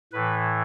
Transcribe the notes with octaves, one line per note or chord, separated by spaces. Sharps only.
A2 E3 B4